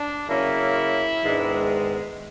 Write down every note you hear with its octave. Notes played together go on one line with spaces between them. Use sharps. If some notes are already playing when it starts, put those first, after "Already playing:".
Already playing: D4
C#3 F#3 A#3 C#4 E4
G#2 D#3 G#3 B3 D4